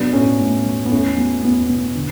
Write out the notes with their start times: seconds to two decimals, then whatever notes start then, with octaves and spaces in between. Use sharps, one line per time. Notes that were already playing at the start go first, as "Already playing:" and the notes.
Already playing: B2 F#3 B3 D4
0.13 A2 A3 C#4
0.39 A2
0.65 F#3
0.85 B3
0.91 E2 A3 C#4
1.17 F#3 B3
1.43 E2 B3
1.69 B2
1.95 D3